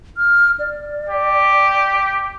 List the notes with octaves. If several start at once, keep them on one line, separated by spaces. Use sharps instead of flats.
F6
D5
G4